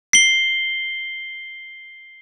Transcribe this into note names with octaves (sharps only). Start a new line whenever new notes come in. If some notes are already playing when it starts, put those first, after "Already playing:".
C7 G7